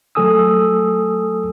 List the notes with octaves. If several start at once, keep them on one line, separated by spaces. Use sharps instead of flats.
F#3 A3 A4 G#5 D#6 E6